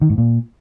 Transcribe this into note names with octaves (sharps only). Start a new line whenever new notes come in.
D#3
G#2
A#2